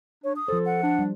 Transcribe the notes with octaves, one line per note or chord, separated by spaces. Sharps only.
D4 C#5
D#6
F3 A4 C5
F#5
D4
G3